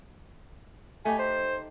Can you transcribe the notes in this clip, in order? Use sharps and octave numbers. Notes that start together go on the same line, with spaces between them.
A3 D#4 G4 G#5
C5